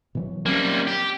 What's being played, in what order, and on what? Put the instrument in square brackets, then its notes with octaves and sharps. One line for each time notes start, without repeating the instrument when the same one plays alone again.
[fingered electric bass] B2 E3 F#3
[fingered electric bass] F#3 C4 C#4 [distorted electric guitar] G3 A#3
[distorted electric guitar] G4